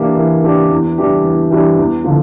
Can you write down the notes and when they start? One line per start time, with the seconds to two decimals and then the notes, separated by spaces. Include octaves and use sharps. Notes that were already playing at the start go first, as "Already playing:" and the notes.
Already playing: E3 A#3 D4 G4
0.17 E3
0.43 A#3 D4 G4
0.70 E2
0.98 E3 G3 D4 G4
1.24 E2
1.50 E3 G3 D4 G4
1.78 E2
2.04 D3 F3